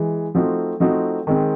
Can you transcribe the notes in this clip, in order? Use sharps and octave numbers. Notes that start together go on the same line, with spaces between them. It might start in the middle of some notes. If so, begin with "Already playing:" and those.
Already playing: E3 G#3
F3 A3 C4 D#4 F#4
F3 A3 C4 D#4 F#4
D#3 G#3 C4